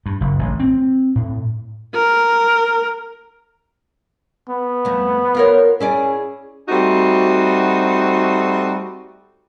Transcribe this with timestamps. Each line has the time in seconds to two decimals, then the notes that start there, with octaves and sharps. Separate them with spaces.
0.06 G2
0.21 F#1
0.39 A1
0.60 C4
1.16 A2
1.95 A#4
4.49 B3
4.85 F2 A3
5.35 F4 A#4 C#5
5.80 C#4 E4 G#4 D5
6.69 G3 A3 C4 D#4 F#4